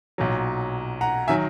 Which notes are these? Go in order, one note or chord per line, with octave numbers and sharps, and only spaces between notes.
B1 A#2 F#3
F#5 A#5
D#3 F#3 E5 G#5